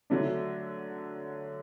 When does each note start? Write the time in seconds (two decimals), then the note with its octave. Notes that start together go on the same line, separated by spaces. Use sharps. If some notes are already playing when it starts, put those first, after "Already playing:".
0.10 D3 F#3 A3 D4